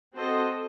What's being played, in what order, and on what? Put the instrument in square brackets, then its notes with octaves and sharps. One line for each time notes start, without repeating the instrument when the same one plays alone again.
[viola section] C4 F#4 A4 C5 D#5